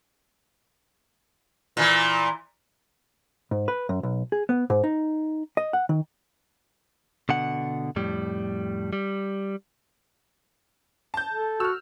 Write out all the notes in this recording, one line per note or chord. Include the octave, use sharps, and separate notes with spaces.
A#2 E3
G#2
B4
F#2
B1
G#4
B3
G#2
D#4
D#5
F#5
D#3
B2 D3 F#5
F2 A2 G3
G3
A5 G6
A4
F#4 E6 F6